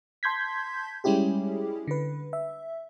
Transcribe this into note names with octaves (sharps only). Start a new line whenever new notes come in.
A5 C6 G6 G#6 B6
G3 G#3 C#4 E4 G4 G#4
D3 B4
E5